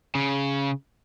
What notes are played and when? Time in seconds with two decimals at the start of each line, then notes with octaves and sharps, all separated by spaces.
0.15 C#3